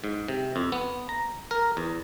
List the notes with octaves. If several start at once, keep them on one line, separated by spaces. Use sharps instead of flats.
G#2
C3
F2
B3
A#5
A#4
E2